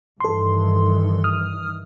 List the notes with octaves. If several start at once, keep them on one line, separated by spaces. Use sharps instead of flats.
G2 D#3 E3 A4 C6
D#6 F6